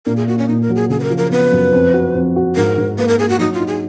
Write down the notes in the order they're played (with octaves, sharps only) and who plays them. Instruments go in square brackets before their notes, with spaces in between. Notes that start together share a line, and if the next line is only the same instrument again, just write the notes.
[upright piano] A#2 [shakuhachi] A#4
[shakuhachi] G#4
[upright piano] A#3 [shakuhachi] F#4
[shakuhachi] C#4
[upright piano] A#2 [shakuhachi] D#4
[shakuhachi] A#4
[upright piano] F#3
[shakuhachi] G#4
[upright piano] C#3 [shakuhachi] G#4
[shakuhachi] B4
A#4
[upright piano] F3
[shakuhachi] A#4
[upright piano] B3 [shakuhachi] B4
[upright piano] F#2
F2
F#4
F2
F#4
[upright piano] G#2 [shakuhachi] A#4
[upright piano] G#2
[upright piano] A#3 [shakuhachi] B4
[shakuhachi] A#4
[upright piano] A#3 [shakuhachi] G#4
[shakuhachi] F#4
[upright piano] F#3 [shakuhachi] D#4
[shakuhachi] F4
[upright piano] D#4
[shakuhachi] G#4